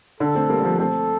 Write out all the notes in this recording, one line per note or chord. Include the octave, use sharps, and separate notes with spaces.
D3 A4
A3 C4
G3 A#3
G3
F3 A3
A3 C4 A4